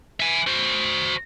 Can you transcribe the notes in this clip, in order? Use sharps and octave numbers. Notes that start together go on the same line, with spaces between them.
E5 G#5
F#4 C5